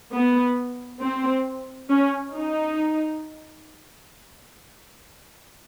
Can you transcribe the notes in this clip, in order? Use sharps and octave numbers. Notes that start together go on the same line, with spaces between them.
B3
C4
C#4
D#4